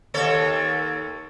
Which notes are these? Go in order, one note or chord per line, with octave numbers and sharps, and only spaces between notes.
D#2 A4 C#5